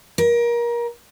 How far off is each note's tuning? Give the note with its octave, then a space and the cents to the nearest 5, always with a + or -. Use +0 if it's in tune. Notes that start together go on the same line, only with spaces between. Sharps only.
A#4 +25